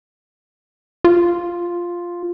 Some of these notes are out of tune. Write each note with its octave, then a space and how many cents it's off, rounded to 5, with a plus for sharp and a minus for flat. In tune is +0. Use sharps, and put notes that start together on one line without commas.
F4 +0